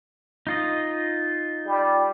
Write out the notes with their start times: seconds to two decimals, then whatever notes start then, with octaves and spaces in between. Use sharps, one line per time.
0.47 D#4 F4 D#5
1.66 G3